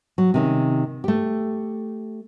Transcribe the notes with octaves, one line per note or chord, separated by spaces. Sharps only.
F#3
C3 D#3 C#4
A3 G4